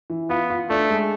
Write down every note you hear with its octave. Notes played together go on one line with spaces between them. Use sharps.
E3
B3 F4
F4
A3 D4
G#3